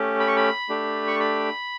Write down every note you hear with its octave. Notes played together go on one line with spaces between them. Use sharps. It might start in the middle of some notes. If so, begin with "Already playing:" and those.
Already playing: A3 C#4 G4
B5
C#6
B5
A3 D4 G4
C#6
B5